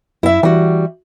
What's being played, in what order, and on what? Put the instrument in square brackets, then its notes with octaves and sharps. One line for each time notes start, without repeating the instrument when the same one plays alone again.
[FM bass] F#2 [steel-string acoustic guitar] E4 E5
[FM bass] E3 [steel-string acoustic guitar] G3 F#4